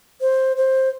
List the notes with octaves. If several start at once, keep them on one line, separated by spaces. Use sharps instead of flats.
C5
C5